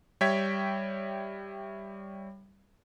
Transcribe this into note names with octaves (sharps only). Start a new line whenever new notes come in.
G3 C#5 E5 G5 G#6 B6